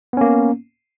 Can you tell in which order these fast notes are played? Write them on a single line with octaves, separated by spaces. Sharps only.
B3 C#4 A#3